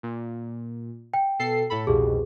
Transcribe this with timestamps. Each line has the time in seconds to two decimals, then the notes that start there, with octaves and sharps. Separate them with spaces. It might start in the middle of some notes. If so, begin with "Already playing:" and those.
0.03 A#2
1.14 G5
1.39 B2 A4 C7
1.70 A2 A4 B5
1.87 C2 F2 B2 G4 G#4